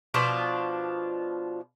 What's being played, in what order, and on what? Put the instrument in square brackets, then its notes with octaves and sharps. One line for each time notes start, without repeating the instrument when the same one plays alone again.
[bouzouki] B2 F3 D4 F4